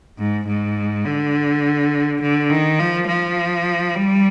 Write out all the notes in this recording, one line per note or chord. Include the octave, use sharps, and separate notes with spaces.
G#2
G#2
D3
D3
D#3
F3
F3
G3